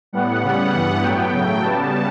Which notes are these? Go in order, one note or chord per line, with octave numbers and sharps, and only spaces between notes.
A2 G3 B3 F#5
C#3 G3 B3
G2 E3 B3 F#5
A2 F#3 B3 G5
C#3 F#3 A3
C#3 G3 B3 A5